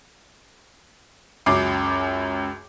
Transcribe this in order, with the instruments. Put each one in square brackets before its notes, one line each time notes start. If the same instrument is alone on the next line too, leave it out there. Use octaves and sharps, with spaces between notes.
[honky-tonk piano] C#2 F#2 D6 C7